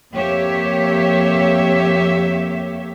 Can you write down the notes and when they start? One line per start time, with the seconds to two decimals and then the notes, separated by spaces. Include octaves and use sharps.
0.12 F2 A#3 G4 C#5 E5